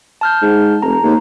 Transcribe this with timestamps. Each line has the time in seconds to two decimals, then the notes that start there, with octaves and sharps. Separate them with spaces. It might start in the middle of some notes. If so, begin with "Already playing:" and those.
0.21 A5 F6 G6
0.42 G#2
0.82 F1 A#5
1.03 D#2